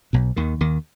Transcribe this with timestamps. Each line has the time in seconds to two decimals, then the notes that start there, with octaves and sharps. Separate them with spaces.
0.13 B1 B2
0.36 D#2 D#3
0.61 D#2 D#3